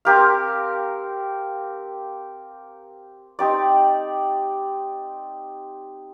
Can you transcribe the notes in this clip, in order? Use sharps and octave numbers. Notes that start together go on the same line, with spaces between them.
C4 G4 A#4 F5
C4 D#4 G4 D5